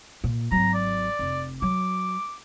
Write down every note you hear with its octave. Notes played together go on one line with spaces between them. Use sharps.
A#2
G#1 F#3 A#5
D5
F1
F#3 D6